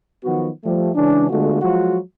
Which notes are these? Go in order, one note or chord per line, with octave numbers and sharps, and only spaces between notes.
D#3 F3 F#3 B3 F#4
F3 G3 A3
C#3 E3 G#3 C#4 D4
D3 G#3 A3 B3 F4 F#4
F3 F#3 G#3 F4 F#4